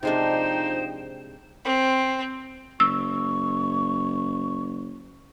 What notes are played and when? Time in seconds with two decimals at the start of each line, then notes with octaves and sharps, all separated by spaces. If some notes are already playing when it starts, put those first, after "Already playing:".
0.03 C3 F3 G#3 D4 D#4 C5 G5
1.65 C4
2.80 F#1 C#6 E6